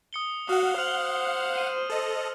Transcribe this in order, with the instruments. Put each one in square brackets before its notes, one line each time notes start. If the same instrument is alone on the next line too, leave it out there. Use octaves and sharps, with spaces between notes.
[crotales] D#6 C#7 G7
[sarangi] F#4 [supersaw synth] F5 F#5 [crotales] D#6
[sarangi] C5 [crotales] F6 F7 F#7
[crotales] D#7
[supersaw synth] A4 D#5